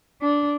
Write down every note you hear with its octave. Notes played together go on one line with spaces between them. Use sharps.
D4